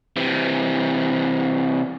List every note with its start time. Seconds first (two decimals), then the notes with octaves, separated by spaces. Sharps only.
0.16 C3 E3